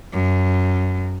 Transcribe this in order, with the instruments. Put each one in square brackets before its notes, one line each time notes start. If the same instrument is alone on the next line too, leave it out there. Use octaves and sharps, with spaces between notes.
[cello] F#2